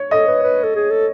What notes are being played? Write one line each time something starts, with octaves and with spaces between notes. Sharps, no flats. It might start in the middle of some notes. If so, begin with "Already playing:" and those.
Already playing: C#5
A4 D#5
B4
B4
A4
G#4
A4